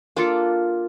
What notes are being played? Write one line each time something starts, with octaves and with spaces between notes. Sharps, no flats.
A#3 D4 F4 A4